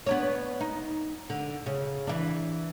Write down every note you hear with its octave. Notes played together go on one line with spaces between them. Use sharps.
B3 D4 C#5
D#4
D3
C#3
E3 D4